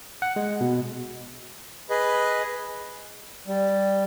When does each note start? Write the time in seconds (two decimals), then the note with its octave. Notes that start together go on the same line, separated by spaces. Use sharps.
0.22 F#5
0.36 G#3
0.61 B2
1.90 G#4 B4 D#5
3.47 G3